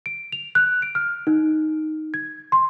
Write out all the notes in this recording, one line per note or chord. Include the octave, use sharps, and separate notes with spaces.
D7
F7
F#6
D7
F6
D#4
G#6
C6